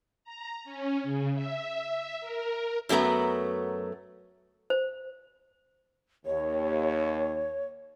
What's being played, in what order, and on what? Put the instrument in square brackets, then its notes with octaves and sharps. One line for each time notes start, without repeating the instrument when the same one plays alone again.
[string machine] A#5
C#4
C#3
E5
A#4
[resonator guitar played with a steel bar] F#2 F#3 A3 B3 A#5
[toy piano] C5
[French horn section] D#2 [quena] C#5